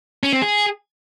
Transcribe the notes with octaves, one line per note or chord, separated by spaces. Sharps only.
C#4
C4
G#4